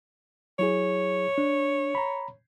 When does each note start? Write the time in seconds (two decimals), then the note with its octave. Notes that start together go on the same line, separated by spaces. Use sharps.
0.59 F#3 E4 G#4 C#5
1.38 D4
1.95 A#5 B5